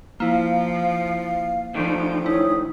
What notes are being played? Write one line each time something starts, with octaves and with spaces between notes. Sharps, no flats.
F3 A#3 E4 F5
D2 D3 D#3 F3
E4 C#5 D#6